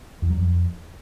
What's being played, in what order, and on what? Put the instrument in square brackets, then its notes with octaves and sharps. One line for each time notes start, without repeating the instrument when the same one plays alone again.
[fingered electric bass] E2
F#3
F2